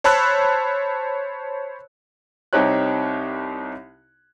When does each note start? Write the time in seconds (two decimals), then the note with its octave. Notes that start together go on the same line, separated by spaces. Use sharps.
0.04 C5 C#5 A5 B5 E6 F#6
2.53 C2 C4 D#4 G4 C#5 F#6